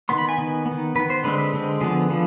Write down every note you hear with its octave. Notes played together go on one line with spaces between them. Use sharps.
D#3 B3 C6
B5
G#5
D#3 B3
B3
D#3
D#3 B3 B4
C5
D3 G#3 C4 B4
B4
D3 G#3 C4
D3 F3 B3 G#4
D3 F3 B3